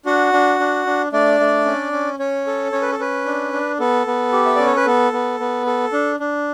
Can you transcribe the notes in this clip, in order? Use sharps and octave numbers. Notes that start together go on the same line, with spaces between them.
D4 F#4 F#5
D4
D4
D4
A3 D4 D5
A3
C#4
C#4
C#4 C#5
A4
C#4 C#5
B4
A4
C#4 B4
D4
D4
B3 A4
B3
G4
E5
C#4 D5
C#5
B4
B3 A4
B3
B3
A4
D4
D4